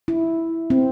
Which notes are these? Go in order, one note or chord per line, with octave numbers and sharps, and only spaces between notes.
E4
C4